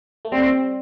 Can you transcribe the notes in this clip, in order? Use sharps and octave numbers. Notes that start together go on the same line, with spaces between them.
A3
G3 C4